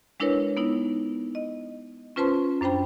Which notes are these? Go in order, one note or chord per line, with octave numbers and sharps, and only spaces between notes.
G#3 D4 E4 A#4 B4 C#5
B3 D#4 E4
D#5
C#4 F4 B4 C5 A5 C6
F#2 D4 C5 G5 B5